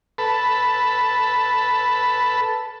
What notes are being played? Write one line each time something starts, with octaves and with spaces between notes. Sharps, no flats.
A4 B4